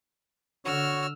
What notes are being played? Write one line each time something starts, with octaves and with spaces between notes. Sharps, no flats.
D3 F#4 C#5 E6 F6